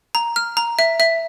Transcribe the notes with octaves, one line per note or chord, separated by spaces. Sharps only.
A#5
F6
A#5
E5
E5